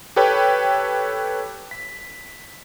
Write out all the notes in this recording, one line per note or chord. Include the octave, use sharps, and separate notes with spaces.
G4 A4 B4 C#5 G5
B6